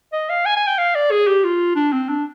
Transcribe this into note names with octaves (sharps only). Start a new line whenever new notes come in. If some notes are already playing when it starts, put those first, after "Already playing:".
D#5
F5
G#5
G#5
G5
F5
D5
G#4
G4
F4
D4
C4
D4